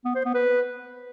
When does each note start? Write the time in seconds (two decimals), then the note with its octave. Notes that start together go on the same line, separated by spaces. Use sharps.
0.05 B3
0.15 C5
0.25 B3
0.34 B4